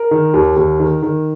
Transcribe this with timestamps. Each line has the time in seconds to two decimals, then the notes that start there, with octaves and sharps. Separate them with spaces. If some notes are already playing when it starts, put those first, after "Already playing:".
Already playing: A#4
0.11 D#3
0.34 D#2
0.56 D#2
0.80 D#3
1.02 D#3